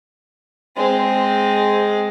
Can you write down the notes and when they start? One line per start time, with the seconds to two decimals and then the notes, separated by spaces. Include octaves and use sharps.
0.76 G#3 C4